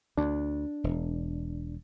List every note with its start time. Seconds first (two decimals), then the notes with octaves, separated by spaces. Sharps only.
0.18 D2 D4
0.84 E1